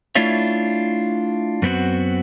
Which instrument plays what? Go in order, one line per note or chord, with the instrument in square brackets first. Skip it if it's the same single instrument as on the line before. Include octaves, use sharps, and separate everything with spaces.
[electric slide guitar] A3 D4 E4 F4 C#5 E5
F#2 B3 C4 F#4